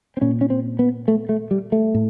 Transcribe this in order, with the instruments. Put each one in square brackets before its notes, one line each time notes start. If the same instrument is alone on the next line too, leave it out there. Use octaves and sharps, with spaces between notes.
[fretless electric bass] C4
A#2 C#4
C#4
C4
B3
A3
A3
G3
A3
A2